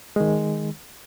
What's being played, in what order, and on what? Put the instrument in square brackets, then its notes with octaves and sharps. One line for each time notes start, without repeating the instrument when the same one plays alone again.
[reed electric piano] D#3 G#3